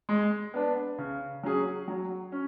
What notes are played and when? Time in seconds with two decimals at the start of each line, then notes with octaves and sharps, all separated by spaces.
0.09 G#3
0.54 B3 D4
0.98 C#3
1.43 F#3 C#4 G#4
1.88 F#3
2.32 C#4